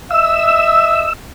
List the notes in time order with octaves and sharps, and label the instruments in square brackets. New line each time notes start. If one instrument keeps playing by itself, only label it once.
[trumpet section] D#5 E5 [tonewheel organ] E6